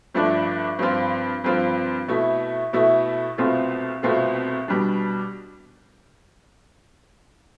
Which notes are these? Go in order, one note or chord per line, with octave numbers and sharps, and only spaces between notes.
G2 F3 A3 D4
G2 F3 C4 F4
G2 F3 C4 F4
B2 A3 E4
B2 A3 E4
C2 B2 A3 C4 F4
C2 B2 A3 C4 F4
B2 G3 D4